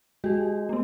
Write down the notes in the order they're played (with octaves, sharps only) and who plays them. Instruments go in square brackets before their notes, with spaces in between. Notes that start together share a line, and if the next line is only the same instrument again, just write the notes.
[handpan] G#3 [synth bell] F#4 G4
[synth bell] A3 B3